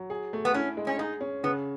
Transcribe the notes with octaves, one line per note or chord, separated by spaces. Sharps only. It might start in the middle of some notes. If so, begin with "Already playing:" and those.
Already playing: F#3
G#4
A3
B3
C#4 E4
G#3
C#4
D#4 G#4
C#4
C#3 B3